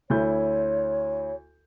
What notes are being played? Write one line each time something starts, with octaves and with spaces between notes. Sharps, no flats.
D2 E4 C#5 G6